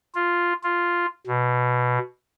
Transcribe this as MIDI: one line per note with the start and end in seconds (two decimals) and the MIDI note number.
0.15 0.53 65
0.63 1.06 65
1.27 1.98 47